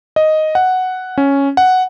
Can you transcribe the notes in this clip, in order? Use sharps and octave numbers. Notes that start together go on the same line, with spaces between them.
D#5
F#5
C#4
F#5